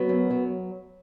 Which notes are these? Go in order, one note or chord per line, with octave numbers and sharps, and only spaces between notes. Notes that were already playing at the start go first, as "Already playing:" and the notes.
Already playing: F#3 B3
F#2
F#3